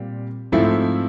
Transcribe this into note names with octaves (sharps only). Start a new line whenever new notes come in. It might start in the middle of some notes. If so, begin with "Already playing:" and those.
Already playing: A#2 G3 C4
G#2 F3 A3 C4 E4